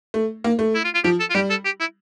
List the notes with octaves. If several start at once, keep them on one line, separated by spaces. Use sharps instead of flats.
A3
A#3
A3
E4
F4
F4
F3 G4
A4
F4
G3 G4
A4
G4
E4